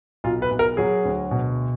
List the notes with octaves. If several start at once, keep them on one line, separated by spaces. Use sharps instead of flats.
B1 F4
B4
B1
A#4
F#3 G#4
D2
B2